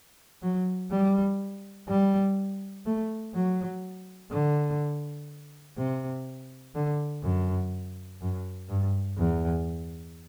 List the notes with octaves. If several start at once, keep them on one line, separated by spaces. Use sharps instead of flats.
F#3
G3
G3
A3
F#3
D3
C3
D3
F#2
F#2
G2
E2